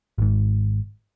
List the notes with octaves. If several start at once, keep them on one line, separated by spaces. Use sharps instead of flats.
G#1 G#2